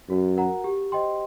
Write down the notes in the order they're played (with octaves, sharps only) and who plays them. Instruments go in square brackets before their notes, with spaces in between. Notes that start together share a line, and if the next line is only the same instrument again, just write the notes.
[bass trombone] F#2 [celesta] F#4
[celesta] A#4 F#5 A#5
G4
C5 D#5 G5 C6